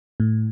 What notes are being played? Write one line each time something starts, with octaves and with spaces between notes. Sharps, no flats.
A2